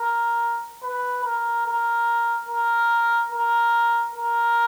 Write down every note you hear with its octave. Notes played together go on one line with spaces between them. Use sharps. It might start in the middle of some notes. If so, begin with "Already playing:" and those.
Already playing: A#4
B4
A#4
A#4
A#4
A#4
A#4